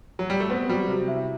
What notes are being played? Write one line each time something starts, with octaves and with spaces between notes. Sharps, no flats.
F#3
G3
A3
B3 C4
F#3 G3
C3
E4